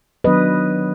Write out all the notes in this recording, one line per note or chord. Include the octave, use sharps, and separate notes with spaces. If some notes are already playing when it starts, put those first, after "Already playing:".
D#3 F#3 B3 D4 B4 D#5